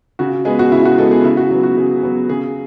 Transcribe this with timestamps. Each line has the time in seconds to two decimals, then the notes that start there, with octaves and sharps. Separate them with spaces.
0.19 C#3 F#4
0.45 G#3 B3 G#4
0.59 F#4
0.71 C#3 E4
0.85 F#4
0.98 G#3 B3 A4
1.11 G#4
1.24 C#3 E4
1.37 F#4
1.51 F#3 B3
1.63 F#4
1.77 C#3 G#4
2.03 F#3 B3
2.29 C#3 G#4